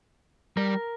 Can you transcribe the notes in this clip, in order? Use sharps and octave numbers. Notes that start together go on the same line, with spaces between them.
G3 A#4